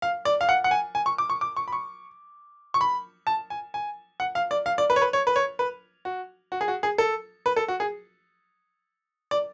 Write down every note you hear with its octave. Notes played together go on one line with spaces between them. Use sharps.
F5
D5
F5
F#5
F#5
G#5
G#5
C#6
D6
C#6
D6
C#6
B5
C#6
C#6
B5
A5
G#5
G#5
F#5
F5
D5
F5
D5
B4
C#5
B4
C#5
B4
C#5
B4
F#4
F#4
G#4
F#4
G#4
A4
B4
A4
F#4
G#4
D5